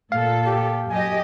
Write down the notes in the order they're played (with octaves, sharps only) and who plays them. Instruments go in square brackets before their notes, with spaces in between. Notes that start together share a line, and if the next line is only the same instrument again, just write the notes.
[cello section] A#2 A4 [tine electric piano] F5
[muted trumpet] G4
[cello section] F#2 G4 D#5 [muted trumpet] G#5